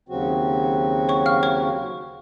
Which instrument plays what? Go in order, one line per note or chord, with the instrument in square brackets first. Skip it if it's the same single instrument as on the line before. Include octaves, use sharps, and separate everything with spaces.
[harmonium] D#2 C#3 F#3 C4 F#4
[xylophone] C#5 C#6
F5 F6
C#5 C#6